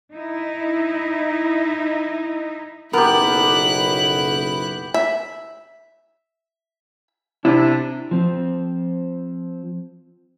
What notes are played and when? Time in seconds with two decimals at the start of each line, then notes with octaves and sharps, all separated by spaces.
0.13 D#4 E4
2.93 F#1 B1 B3 E4 G4 A#4 F#6
4.94 E5
7.45 C3 D4 E4
8.11 F3 C4